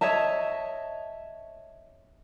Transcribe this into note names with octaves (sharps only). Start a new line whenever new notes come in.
C#5 D#5 E5 A5